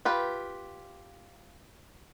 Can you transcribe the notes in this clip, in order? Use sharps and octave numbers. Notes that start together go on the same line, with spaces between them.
F4 G4 B4